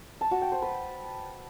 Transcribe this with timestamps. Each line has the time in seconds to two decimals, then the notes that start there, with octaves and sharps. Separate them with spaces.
0.21 A5
0.31 F#4
0.42 G5
0.52 C5
0.62 B4